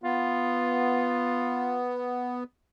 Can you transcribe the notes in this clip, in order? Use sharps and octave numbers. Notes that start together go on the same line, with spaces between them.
B3 F4